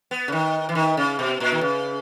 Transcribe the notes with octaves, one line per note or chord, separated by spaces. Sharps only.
B3
C#3
D#3
E3
D#3
C#3
B2
A#2
D#3
C#3